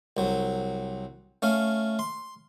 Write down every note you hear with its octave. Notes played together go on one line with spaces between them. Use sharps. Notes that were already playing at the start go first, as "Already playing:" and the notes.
C2 F#3
A3 C#4 F5
C6